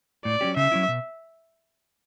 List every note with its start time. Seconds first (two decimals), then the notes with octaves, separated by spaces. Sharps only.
0.25 A2 D5
0.41 F#3 C#4 G4
0.57 C#3 E5
0.72 F#3 C#4 E4
0.88 B2